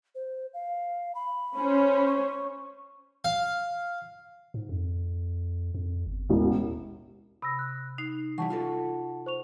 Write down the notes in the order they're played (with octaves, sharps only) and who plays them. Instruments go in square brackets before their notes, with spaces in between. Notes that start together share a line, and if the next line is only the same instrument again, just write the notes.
[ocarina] C5
F5
B5
[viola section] C#4 C5
[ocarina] C#6
[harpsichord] F5
[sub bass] G#2
F2
F2
G1
[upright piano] E1 A1 [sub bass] D#2
[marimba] C3 [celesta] B5 E6 A#6
[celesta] F#6
[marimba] D#4 [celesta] C7
[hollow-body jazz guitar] E3 G3 E4 [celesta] F#5 A5 [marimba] C#6
[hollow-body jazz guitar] F4 F#4 A4
[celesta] C5 C#6 F7